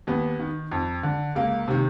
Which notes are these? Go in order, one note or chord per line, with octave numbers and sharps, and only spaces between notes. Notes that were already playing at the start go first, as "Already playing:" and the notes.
D#2 B3
D#3
F2
D3
C#2 A#3
C3 D#3